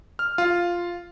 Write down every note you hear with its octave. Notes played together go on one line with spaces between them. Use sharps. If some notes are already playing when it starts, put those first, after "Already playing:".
F6
F4